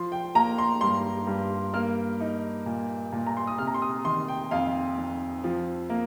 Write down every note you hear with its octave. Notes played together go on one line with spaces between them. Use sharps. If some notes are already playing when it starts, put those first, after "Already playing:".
Already playing: F3 C6
G5
A#3 A#5
C6
G2 C6
G2
A#3 F6
D#4
A#2
A#2
A#5
C6
D#6
C3 F6
A#5
C6
D#6
D#3 C6
G5
F2 F5
F2
F3
A#3